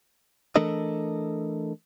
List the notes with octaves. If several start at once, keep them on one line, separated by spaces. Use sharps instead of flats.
E3 A3 D4 A4 A#4 D#5